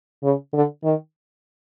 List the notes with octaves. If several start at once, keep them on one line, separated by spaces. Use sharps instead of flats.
C#3
D3
D#3